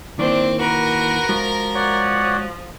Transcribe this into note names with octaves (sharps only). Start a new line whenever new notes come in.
D#3 A#3 C4 D4 E4
F#4 A#4 B4
F3 G#3 F#4 A#5
C#5 D5 F#5